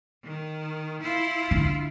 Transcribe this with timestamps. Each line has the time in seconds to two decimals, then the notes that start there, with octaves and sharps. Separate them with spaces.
0.24 D#3
1.03 E4 F4
1.51 D3